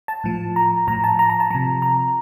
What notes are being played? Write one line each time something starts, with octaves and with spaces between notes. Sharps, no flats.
A5
A2 F3
A#5
A2 F3 A#5
A5
A#5
A#5
A5
C3 F3 A#5
A#5